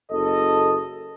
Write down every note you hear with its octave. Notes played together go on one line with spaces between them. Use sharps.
F#1 A4 D#5